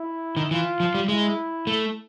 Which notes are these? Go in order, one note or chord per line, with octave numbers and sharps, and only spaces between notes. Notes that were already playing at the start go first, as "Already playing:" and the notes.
Already playing: E4
D#3
E3 F4
F3
G3
G#3 E4
A3